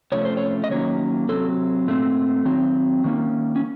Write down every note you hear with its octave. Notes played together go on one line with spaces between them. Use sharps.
C3 F3 A3 C#4 C#5
C5
C#5
D#5
D#3 F#3 A#3 C#4 C#5
C3 F#3 C4 A4
A#2 A3 C4
D#3 F#3 C4
D#3 A#3 C#4
C#4